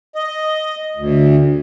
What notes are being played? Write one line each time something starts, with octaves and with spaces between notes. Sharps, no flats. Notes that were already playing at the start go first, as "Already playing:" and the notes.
D#5
D2